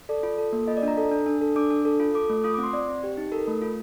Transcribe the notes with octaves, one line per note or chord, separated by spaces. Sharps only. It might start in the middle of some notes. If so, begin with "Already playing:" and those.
A4 D5
F4
A4
A#3
F4 D#5
D5
D4
A#5
A4
D4
D4
A4
D4 D6
D4
A4
F4
A4 D6
A3
F4 D#6
D6
C4
C6
C4 D5
C4
G4
D#4
A4 A#4
A3
F4